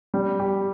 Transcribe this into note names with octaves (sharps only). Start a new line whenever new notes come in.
G3
G4